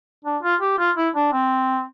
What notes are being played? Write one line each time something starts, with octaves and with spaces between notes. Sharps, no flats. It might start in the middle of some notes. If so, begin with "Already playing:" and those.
D4
F4
G4
F4
E4
D4
C4